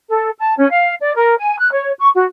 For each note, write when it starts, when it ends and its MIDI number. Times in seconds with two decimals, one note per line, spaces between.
0.09 0.30 69
0.39 0.53 81
0.57 0.67 61
0.69 0.94 77
1.01 1.15 74
1.15 1.36 70
1.38 1.59 80
1.59 1.70 90
1.72 1.91 73
1.99 2.09 85
2.14 2.25 66